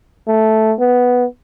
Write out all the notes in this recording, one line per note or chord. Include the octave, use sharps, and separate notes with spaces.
A3
B3